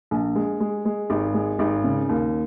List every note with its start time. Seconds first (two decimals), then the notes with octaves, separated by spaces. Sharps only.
0.11 A#1
0.35 G#3
0.60 G#3
0.85 G#3
1.10 G#1
1.34 G#3
1.59 G#1
1.84 C#3
2.09 D#2